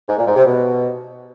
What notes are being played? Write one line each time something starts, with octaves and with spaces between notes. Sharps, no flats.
G#2
A#2
G#2
C3
B2